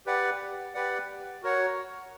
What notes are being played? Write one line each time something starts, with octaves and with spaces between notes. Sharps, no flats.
G4 B4 D5 F#5
G4 B4 D5 F#5
F#4 A#4 C#5 F#5